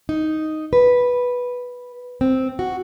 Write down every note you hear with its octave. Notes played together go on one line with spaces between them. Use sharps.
D#4
B4
C4
F#4